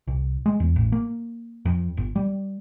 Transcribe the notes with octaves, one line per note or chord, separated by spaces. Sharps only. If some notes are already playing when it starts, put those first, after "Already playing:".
C2
G#3
E2
A1
A#3
F2
G1
G3